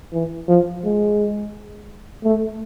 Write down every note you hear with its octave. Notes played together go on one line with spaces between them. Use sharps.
E3
F3
G#3
A3